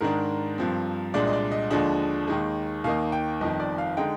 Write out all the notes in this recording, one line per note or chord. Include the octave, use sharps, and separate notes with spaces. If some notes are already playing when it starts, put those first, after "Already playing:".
G#2 D#3 G#3 D4 A#4
G2 F3 C4
C2 A#2 G#3 D4 D5
D#5
D5
D#5
D#2 D3 F3 G#3 D4 D#5
D#2 D#3 G#3
D#2 D#3 A#3 D#4 F5
G5
G1 F2 D#3 D#5
D5
F5
D3 G#3 D#4 G5